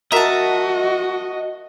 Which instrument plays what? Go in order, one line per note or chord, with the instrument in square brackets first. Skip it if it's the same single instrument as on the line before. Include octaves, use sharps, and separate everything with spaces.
[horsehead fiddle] F#4 [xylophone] A#4 A#5 [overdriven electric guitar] D#5 [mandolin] E5 A5